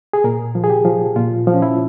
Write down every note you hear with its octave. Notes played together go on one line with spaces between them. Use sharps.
G#4
A#2 A#4
F3
G#4
G4
F3
A#2 F4
F3
C#4
E4